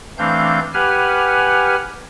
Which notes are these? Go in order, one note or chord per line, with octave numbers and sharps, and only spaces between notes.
E3 A3 C4 D4 F5 G6
G4 B4 F#5 G#5 F6